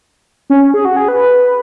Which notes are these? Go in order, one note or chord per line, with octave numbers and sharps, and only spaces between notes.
C#4
G#4
F#4
G#4
B4